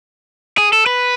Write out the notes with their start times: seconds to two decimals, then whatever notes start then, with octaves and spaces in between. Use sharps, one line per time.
0.58 G#4
0.73 A4
0.86 B4